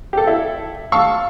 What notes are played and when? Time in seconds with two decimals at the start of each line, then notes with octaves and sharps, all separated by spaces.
0.13 G4 A4
0.27 E4
0.92 F5 A5 C#6 E6